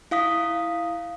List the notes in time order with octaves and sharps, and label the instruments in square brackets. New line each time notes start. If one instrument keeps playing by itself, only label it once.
[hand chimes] E4 F5 D#6 B6